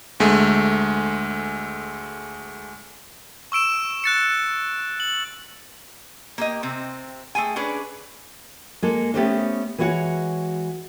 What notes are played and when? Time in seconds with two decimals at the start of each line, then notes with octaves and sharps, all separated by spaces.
0.20 D2 G#3 A3
3.52 C#6 E6 D7 E7
4.04 F#6 A6 C#7
5.00 F#7
6.38 A#3 G4 D#5
6.63 C3 C4
7.35 A3 G#4 G5 G#5
7.56 C#4 D4 G#4 B4
8.82 G#3 A#3 A4
9.14 A3 B3 C#4 G4 C5 D#5
9.78 E3 G#3 F#4 C#5 F#5